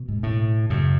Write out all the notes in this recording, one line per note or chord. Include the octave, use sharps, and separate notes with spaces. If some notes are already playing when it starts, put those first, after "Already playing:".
Already playing: B2
G#2
A2
F#2 C#3